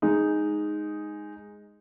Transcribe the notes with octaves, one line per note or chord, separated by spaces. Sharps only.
G#3 D#4